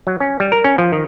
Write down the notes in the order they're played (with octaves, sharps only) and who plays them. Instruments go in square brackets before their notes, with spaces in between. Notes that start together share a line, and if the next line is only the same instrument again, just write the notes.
[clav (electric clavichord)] F#3
C#4
G3
A#4
C#4
F3
D#3